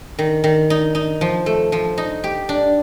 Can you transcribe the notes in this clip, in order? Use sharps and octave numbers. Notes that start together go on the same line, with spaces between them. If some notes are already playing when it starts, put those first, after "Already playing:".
D#3
D#3
D#4
D#4
F3
A3
F3
D#4
G4
D4